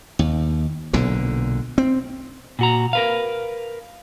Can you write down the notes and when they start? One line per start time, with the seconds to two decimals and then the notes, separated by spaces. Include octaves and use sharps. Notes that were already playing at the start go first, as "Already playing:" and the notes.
0.19 D#2
0.93 B1 A#2 D3
1.78 C4
2.59 A#2 F#4 A#5
2.93 A#4 B4 F5